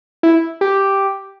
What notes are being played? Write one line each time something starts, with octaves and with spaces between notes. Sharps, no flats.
E4
G4